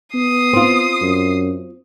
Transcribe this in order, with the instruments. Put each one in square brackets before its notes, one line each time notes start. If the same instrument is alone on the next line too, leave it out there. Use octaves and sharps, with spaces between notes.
[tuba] B3 [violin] D#6 C7
[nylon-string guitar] C4 F4
[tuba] F#2